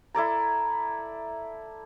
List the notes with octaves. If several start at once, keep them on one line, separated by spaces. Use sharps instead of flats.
E4 A4 D5 A#5